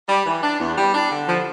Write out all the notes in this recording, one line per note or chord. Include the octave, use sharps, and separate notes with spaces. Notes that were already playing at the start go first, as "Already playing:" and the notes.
G3
E3
D4
E2
G3
D4
D3
F3